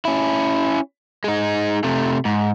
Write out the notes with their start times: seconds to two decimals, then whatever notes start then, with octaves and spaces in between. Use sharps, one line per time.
0.05 C#4 E4
1.24 G#3 D#4
1.84 C3 A3
2.25 G#2